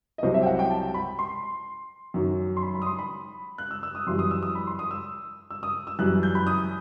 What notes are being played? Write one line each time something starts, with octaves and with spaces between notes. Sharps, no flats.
D#5
C2 C3 F#3 C5
E5
G5
F#5
G5
A5
B5
C6
F#2 D#3 F#3
C6
B5
B5
D#6
C6
B5
F#6
E6
E6
D#6
F#2 E3 G3 C6
D#6
E6
D#6
B5
C6
D#6
E6
E6
D#6
E6
F#2 E3 G3 F#6
G6
B5
D#6